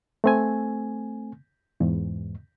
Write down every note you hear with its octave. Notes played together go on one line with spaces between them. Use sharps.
A3 C4 G#5
E2 G#2